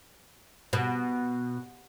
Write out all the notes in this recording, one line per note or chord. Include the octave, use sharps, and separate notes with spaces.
B2